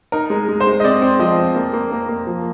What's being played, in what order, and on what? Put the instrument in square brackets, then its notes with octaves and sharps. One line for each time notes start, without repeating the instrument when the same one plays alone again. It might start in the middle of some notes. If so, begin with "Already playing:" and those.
[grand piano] D#4 [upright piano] A#4
[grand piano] G#3
G#3
[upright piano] C5
[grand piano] G#3
[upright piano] D#5
[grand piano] C4 [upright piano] D5
[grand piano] C4
[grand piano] F3 [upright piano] D#5
[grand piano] C4
A#3
A#3
A#3
A#3
F3